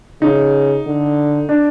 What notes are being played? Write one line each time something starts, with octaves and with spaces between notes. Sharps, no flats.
C#3 D#4
D3
D4